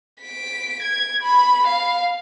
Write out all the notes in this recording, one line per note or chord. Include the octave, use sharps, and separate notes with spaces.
B6 D7
G#6
B5
F5